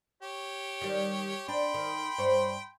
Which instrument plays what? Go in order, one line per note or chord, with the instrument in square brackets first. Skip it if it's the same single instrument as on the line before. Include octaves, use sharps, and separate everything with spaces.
[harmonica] G4 C#5
[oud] D#3 G3
[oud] D4 [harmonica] G5 B5 C6
[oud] D#3
G2 C5 C#5